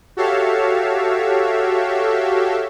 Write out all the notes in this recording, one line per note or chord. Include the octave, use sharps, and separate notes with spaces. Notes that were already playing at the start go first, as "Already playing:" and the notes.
F#4 G4 A4 C#5 E5 F5